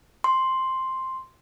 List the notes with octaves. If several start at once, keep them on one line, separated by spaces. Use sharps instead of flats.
C6